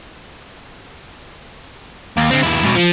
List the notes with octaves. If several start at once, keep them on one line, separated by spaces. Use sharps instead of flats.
D#2
D3 C4
D#2 E4
C#2 B2
F3